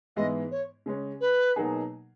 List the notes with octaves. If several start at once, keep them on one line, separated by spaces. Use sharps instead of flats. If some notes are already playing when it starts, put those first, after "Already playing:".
G#2 E3 G#3 B3 E4 D#5
C#5
C#3 G#3 C#4
B4
B2 F#3 A#3 D#4 G#4